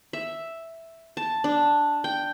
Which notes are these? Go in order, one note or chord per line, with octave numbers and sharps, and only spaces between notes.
E5
A5
D4
G5